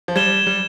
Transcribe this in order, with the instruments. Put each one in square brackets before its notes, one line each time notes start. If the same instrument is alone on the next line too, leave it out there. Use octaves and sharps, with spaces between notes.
[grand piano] F3
[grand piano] G3 [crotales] G#6 E7 G7
[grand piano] G3